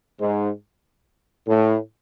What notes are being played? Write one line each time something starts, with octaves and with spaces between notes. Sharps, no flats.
G#2
A2